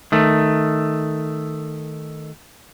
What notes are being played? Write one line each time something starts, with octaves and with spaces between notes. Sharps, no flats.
D#3 A3